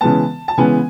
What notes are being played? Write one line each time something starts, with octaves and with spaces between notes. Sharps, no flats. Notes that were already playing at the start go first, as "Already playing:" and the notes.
C#3 E3 G#3 B3 A5
A5
C#3 E3 G#3 B3 G#5